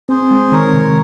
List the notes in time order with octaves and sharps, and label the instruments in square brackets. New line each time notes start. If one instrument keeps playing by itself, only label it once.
[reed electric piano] C4 [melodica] G#4 C5
[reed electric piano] G#3
[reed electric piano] D#3 [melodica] A#4 C#5
[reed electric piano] C3